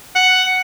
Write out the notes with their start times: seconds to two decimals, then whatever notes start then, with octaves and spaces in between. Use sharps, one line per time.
0.16 F#5